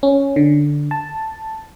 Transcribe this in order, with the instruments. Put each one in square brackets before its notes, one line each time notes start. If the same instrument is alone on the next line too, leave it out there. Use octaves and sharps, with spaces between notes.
[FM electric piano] C#4
D3
A5